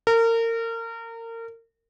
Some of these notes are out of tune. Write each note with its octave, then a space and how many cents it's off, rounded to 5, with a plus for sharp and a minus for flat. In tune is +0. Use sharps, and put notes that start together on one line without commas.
A#4 -30